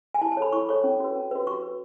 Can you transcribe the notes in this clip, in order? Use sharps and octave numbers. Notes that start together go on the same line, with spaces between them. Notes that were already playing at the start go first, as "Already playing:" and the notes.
G#5
E4 A5
A5
A4 C#5 B5
E4 C#6
A4 C#5 C#6
C#4
F#4 B4
C#4
F#4 B4
F#4 C#6
B4